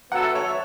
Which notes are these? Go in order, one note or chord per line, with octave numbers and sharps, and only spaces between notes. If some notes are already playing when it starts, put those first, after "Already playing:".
F#3 B3 F#4 A4 F#5
E5
C#5
E5